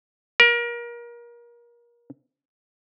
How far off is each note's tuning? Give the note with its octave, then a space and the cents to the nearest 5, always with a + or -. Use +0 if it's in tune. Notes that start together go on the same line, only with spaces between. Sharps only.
A#4 +30